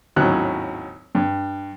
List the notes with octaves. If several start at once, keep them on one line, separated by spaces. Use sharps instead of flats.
G#1 D#2 A2 F#3 C#4 F#6
G2